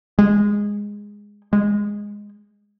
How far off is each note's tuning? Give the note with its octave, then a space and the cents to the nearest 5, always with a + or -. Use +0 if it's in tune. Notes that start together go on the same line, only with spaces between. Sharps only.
G#3 -10
G#3 -10